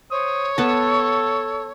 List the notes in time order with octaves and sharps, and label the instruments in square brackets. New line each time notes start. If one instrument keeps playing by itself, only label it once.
[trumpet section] C5 D#6 [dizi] C#5
[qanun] B3 A5 [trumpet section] A4